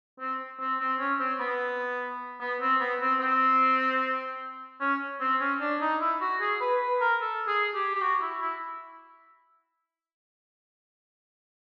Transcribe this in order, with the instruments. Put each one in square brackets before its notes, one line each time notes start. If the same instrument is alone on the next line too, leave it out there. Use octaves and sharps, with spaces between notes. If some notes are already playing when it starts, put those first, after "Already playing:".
[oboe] C4
C4
C4
C#4
C4
B3
B3
C4
B3
C4
C4
C#4
C4
C#4
D4
D#4
E4
F#4
G#4
B4
B4
A#4
A4
G#4
G4
G4
F#4
E4
E4